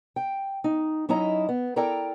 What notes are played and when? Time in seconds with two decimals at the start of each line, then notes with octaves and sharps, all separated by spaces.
0.16 G5
0.64 D#4
1.09 F#3 C#4 D#4 E4 D#5 A#5
1.49 B3
1.76 E4 A4 A#4 D5 G5 A#5